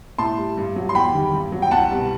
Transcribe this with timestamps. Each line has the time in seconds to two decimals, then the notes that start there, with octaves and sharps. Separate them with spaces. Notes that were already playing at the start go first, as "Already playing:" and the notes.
0.18 A2 A5 C6
0.38 G3
0.57 G2
0.76 F#3
0.89 C6
0.94 E2 G5 B5
1.13 D#3 G3
1.33 G2
1.52 F#3
1.62 G5
1.71 C2 F#5 A5
1.91 B2 G3